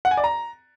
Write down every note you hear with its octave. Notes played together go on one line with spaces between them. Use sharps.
F#5
G#5
D5
A#5